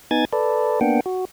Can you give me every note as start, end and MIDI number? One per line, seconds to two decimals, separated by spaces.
0.11 0.25 59
0.11 0.25 63
0.11 0.25 80
0.11 0.25 92
0.11 0.25 93
0.33 0.80 69
0.33 0.80 71
0.33 0.80 74
0.81 1.01 58
0.81 1.01 59
0.81 1.01 62
0.81 1.01 78
0.81 1.01 79
1.06 1.25 66